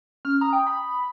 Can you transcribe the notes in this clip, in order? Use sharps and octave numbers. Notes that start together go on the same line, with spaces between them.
C#4 F6
A#5 D#6
G5
B5